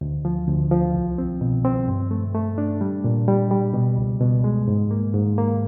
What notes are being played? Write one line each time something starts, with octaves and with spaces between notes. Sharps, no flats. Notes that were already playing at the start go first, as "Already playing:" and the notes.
D2
F3
D2
F3
C2
C4
B2
C4
G2
A3
A3
D4
G3
A#2
G3
G3
B2
C#2
B2
G#3
G#2
A#3
G#2
A#3